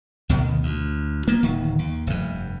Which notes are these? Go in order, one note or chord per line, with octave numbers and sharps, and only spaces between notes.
D2 B2 D#3
D2
A#3 B3
D1 D#3
D#2
F1 G2